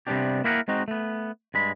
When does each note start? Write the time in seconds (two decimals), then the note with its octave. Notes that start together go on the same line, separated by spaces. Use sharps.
0.07 C3 G3 B3 C#4 D4 G4
0.44 A#3 E4 G4 G#4 A#4 F#5
0.68 G#3 C4 D#4 F#4
0.88 A3 B3
1.54 G2 G#3 B5